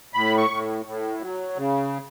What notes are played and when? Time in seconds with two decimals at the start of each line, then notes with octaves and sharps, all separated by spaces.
0.14 A2 B5
0.38 C#6
0.50 A2
0.86 A2
1.21 F#3
1.57 C#3